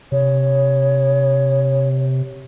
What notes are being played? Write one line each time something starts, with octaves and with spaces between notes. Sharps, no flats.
C3 C#5